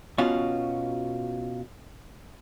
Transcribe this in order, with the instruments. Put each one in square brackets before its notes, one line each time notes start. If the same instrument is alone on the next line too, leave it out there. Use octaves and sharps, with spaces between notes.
[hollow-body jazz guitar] B2 C#4 F4 F#4